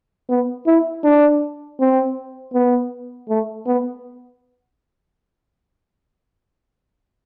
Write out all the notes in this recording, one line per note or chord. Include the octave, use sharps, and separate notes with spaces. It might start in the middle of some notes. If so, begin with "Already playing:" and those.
B3
E4
D4
C4
B3
A3
B3